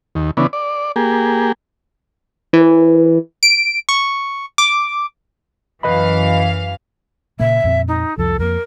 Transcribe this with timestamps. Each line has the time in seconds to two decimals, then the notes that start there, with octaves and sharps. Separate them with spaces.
0.15 D#2
0.37 C#3 E3 B3 D4
0.53 D5
0.96 A#3 G4 G#4
2.53 E3
3.43 D7
3.89 C#6
4.58 D6
5.83 F#2 E3 B4 D#5 F5 B5
7.40 A#2 C#3 A#3 E5
7.64 F2 A#2 C4
7.88 D#4
8.18 C2 F2 F3 A4
8.39 F2 A#3 A#4